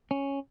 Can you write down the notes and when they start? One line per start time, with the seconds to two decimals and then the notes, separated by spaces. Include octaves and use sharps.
0.11 C#4